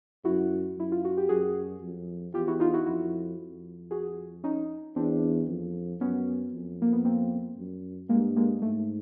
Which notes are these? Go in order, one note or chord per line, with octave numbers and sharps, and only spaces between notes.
F#2 E4 F#4
F#2 E4
F4
F#4
G4
F#2 F#4 G#4
F2
E2 F4 G4
E4 F#4
D#4 F4
E4 F#4
F2 E4 F#4
F2
F#4 G#4
C#4 D#4
E2 C4 D4
F2
F#2 B3 C#4
F2
A#3
B3
A#3 C4
F#2
G2 G#3 A#3
G#3 A#3
G#2 A3